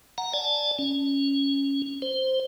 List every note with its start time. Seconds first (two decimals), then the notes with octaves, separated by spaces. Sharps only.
0.18 F#5 A#5
0.33 D5 G#5 A5
0.79 C#4
2.02 C5